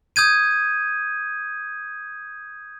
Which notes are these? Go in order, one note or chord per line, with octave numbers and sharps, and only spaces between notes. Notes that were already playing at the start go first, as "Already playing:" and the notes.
D#6 G6 G#6 D#7